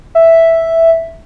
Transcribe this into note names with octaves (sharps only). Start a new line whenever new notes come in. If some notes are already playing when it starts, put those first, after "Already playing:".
E5